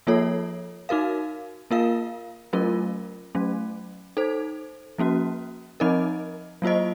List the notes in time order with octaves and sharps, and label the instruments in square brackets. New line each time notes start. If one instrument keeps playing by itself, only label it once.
[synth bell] F3 A#3 F4 A4 C#5
D#4 F#4 A#4 F5
A#3 F4 A#4 F5
F#3 A3 C#4 F4 A#4
F#3 A3 C#4
D#4 A4 C5
F3 A#3 C#4 F#4
F3 C4 D#4 A#4 D#5
F#3 A#3 F4 C5 D#5